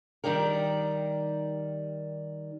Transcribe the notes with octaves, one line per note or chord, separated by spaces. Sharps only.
D#3 G3 D#4 G4 A#4